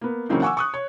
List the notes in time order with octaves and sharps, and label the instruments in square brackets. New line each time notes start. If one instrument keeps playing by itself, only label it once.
[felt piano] A#3 B3
C#3 E3 F#3 A#3 C4 D#4
F#5 G#5 C#6 D6 E6
C#6 D#6 F#6
C#5